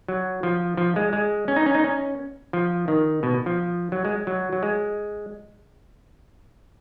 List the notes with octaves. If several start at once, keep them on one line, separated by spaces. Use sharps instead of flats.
F#3
F3
F3
G#3
G#3
C#4
D#4
C#4
D#4
C#4
F3
D#3
B2
F3
F#3
G#3
F#3
F#3
G#3